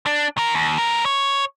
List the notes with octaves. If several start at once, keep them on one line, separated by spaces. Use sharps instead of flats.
D4
D#3 A#4
D#2
A3 A#4
C#5